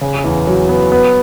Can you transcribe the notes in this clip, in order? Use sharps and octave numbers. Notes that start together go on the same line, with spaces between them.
C#3
E2
F#3
B3
B3